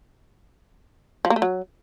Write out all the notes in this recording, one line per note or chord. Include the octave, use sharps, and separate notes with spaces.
F3
A#3
A3
F#3